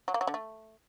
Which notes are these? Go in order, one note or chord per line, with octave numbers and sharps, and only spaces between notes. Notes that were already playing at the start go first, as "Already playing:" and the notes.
F#3
A#3
F#3
D3
A3